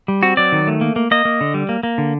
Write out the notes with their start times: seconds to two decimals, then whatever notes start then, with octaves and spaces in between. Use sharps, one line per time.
0.08 G3
0.23 C4 F#4
0.37 F#3 D5
0.52 D#3
0.68 A3
0.81 A#3
0.96 A#3
1.11 A#3 D#5
1.25 A#3
1.41 D3
1.54 G3
1.69 A#3
1.83 A#3
1.98 D3